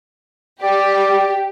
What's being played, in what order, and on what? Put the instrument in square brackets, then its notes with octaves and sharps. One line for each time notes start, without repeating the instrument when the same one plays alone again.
[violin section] G4 [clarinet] D5